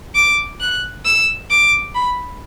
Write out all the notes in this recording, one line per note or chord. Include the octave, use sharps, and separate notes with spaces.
D6
F#6
E6
D6
B5